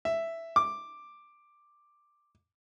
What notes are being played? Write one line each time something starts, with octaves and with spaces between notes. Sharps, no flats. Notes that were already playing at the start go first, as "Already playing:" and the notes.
E5
D6